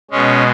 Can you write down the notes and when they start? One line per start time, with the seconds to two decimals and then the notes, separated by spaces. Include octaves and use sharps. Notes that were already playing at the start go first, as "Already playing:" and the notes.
0.11 B2 G#3 C#4